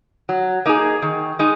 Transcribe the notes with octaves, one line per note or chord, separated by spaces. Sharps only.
F#3
A#3 D#4 G#4
D#3
G#3 D#4